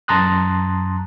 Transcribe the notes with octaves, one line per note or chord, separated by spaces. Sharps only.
F#2 A5 A#5 C6 D#6 F#6